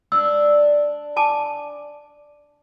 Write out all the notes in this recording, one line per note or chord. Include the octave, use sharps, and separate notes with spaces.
D4 E6
G#5 A5 D6